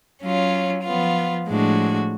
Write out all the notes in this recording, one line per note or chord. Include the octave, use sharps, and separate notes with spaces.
F#3 C#4 F4
F3 B3 F4
A2 F3 G#3 D4 F#4